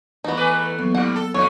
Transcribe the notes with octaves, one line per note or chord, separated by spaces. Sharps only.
E2 B3 D#4
E2 A3 B4 G#5 D6
E2 F#3 A#3 B3
G#2 G3 F#5
A4
F2 D4 D#4 C#5